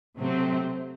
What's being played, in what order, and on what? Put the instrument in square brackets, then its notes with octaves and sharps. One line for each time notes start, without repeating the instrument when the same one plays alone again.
[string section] C3 F#3 A3 C4